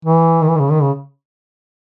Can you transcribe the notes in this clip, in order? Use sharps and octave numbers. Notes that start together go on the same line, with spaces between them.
E3
D#3
E3
D#3
C#3
D#3
C#3